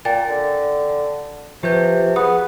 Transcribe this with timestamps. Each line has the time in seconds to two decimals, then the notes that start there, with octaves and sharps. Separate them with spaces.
0.05 A#2 G5 G#5 A6
0.29 D3
1.63 C3 F3 G4 B4 G6
2.16 B3 G#4 D#6